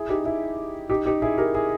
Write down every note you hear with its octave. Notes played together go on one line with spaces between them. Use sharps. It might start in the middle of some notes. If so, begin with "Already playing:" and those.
Already playing: E4 G#4
D#4 G4
E4 G#4
D#4 G4
D#4 G4
E4 G#4
G4 A#4
E4 G#4